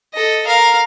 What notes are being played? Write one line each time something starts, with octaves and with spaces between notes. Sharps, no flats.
A4 D#5
A#4 F5